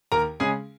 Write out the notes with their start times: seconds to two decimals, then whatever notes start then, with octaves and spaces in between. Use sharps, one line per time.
0.12 D#2 A#4 A#5
0.40 C#3 G#3 C#4 G#4 G#5